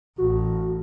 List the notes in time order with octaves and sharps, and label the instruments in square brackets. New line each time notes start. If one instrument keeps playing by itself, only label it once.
[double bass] A1 [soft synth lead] F#4